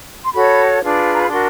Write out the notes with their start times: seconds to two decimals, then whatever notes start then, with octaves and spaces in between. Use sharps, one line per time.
0.25 C6
0.34 F#4 A4 C#5 B5
0.82 D4 F4 G#4 B4
1.14 A#5
1.22 B5
1.29 D4 F#4 A#4 C6